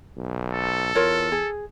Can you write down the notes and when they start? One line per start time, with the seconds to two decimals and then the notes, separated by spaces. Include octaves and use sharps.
0.17 B1
0.54 A4
0.95 E2 F4 A#4 C#5
1.32 G#4